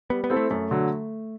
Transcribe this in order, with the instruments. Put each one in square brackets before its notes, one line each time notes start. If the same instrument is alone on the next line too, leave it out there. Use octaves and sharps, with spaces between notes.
[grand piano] G3 [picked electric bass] B3
[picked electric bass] B3
[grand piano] C4 E4 A4
[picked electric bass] A3
[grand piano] F#2 [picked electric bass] A3
[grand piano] D3 F#3